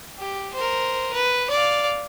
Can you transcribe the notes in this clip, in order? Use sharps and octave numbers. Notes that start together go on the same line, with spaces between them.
G4
A#4 C5
B4
D5 F5